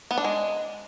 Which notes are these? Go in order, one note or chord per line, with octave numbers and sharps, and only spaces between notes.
B3
D4
G#3